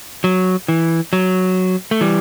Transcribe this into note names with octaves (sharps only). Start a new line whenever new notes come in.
F#3
E3
F#3
A3
E3 G3